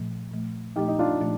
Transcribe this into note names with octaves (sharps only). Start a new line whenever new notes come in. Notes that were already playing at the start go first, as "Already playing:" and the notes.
Already playing: A#2 F3 A3
A#2 F3 A3
A#2 F3 A3 D#4 G4
D#4
D4 F4
A#2 F3 A3 D#4